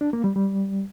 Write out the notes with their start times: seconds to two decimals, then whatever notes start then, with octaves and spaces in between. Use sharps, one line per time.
0.01 D4
0.13 A#3
0.24 G3
0.36 G3